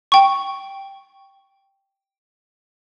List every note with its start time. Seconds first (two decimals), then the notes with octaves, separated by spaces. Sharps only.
0.12 G5 C#6